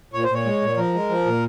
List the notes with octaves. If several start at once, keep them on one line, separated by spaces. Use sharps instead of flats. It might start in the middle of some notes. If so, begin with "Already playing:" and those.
A#2 C#5
C5
A#2 C#5
G#3
A#2
F3 A#4
G#3
F3
A#2